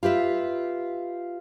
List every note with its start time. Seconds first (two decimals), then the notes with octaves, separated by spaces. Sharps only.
0.03 F4 G4 B4 E5